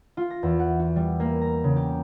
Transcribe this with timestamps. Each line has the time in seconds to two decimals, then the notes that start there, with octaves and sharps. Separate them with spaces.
0.17 F4
0.30 A#6
0.43 E2
0.59 F#5
0.79 F#4
0.96 G3
1.20 A#3
1.41 A#5
1.64 C#3
1.76 G4